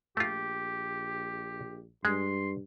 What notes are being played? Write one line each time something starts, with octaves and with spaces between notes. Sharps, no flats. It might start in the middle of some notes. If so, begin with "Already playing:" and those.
A#1 A3 F4 G4
G2 G#3 C6